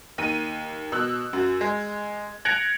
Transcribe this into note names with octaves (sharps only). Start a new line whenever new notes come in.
D#2 D#7
B2 E6 F#6
F#2 F#4
G#3
F#6 G#6 A#6 C#7 D7 F7